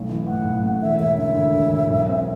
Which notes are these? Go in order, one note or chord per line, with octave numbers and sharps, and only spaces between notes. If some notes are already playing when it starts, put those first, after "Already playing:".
Already playing: B1 A3 E4
E3
A2 F#5
B1
A3
E1 E5
E1 E5
D3 E5
D2
E1
E1
B1
C4